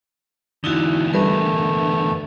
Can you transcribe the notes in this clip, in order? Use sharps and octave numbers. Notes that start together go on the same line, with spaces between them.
E2 D3 D#4 E4 F#4
G3 A3 A#4 B4